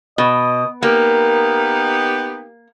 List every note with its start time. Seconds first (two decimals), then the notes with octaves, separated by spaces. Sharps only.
0.18 B2 D#5
0.83 A#3 B3 D#4 G4 A#4